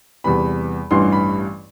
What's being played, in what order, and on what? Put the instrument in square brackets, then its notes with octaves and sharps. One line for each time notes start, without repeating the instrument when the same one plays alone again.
[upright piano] E2 C3 G3 B3 B5
A1 G2 E3 G3 C6
B5